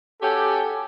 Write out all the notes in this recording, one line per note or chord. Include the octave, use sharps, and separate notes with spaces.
C#4 F#4 G4 A4